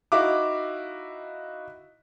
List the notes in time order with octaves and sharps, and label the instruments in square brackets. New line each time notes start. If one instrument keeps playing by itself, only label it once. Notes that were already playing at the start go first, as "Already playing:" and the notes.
[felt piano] D#4 E4 F#4 E5 F5 D6